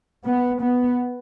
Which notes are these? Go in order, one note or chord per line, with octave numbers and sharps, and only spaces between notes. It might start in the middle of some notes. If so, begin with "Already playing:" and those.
B3
B3